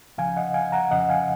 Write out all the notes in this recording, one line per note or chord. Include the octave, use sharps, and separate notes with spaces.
C#2 C#3 F3 F5 G#5
D#5 F#5
F5 G#5
F#5 A#5
F2 C#3 F3 D#5 F#5
F5 G#5